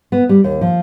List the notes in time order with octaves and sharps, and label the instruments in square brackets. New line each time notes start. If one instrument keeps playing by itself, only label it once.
[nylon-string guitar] B3
G3
D#2
F3